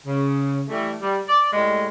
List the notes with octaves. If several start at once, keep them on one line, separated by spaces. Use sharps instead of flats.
C#3
E3 G3 A3
G3
D5
A2 G3 G#3